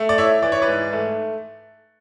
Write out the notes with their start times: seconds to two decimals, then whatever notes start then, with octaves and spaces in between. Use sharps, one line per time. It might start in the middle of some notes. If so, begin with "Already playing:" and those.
Already playing: A3
0.09 D5
0.18 E4 C#5 E5
0.42 E3 D5
0.52 C#5
0.62 B4 D5
0.68 G#2
0.93 A3